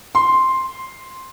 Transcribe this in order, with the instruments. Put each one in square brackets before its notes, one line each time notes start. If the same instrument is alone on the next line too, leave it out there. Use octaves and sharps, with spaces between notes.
[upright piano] C6